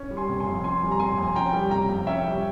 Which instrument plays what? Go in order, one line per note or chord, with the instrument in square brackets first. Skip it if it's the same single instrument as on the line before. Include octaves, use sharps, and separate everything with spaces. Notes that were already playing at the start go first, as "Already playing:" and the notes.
Already playing: [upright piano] C#4
G3
[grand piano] G#5 C6
[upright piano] C3
[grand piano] G#5 C6
[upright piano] F2
[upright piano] C#4 [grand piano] G#5 C6
[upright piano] G3
[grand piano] A#5
[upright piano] C3 [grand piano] G#5 C6
[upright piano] F2
[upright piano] C#4 [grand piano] G5 A#5
[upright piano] G3
[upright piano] C3 [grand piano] G5 A#5
[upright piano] F2
[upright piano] C#4 [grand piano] E5 G5
[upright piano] G3